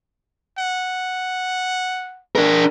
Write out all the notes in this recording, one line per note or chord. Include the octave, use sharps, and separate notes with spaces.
F#5
D4 A#4